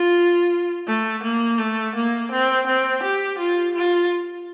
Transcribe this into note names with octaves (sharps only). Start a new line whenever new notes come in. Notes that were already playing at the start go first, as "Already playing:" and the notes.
Already playing: F4
A3
A#3
A3
A#3
C4
C4
G4
F4
F4